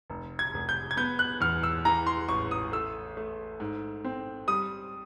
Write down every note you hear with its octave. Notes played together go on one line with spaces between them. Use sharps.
F1
G#6
F1
G6
G#6
B3 G6
F#6
E2 F6
E6
E3 A#5
C6
A1 C#6
D#6
A3 E6
A3
G#2
C4
G3 D#6